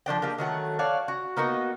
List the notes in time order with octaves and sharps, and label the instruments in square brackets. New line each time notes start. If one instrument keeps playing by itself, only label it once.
[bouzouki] F3 G#3 D4 G5
G#3 A#3 G4
D#3 F#3 A3 F#5
F#4 C#5 D5 F5
F#4
A#3 B3 D#4 F#4